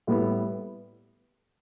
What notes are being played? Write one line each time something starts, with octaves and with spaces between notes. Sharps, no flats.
A2 G3 B3